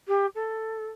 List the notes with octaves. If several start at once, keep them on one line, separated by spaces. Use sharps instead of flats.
G4
A4